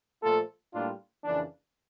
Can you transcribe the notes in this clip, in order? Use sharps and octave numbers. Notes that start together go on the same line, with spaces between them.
A#2 F3 A3 F4 A4
A2 G3 A#3 D4 F4
F2 C#3 E3 A#3 D4